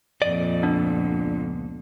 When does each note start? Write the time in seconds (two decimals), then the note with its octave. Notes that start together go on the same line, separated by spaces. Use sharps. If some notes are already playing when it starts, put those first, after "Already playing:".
0.22 F2 A#2 D5 D#5
0.63 C#2 B3 D4